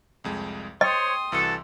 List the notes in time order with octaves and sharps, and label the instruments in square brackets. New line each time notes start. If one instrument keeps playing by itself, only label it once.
[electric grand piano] C2 F2 G#3
[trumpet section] C5 C#5 [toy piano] D#5 [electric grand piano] G5 [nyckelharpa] C6 D#6
[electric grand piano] C2 E3 E6 [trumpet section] F#4 A4